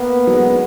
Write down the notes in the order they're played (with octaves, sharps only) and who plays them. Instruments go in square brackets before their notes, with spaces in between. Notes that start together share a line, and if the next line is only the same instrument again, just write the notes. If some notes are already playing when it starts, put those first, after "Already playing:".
Already playing: [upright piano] A#3 [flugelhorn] B3
[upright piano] F#3
G#3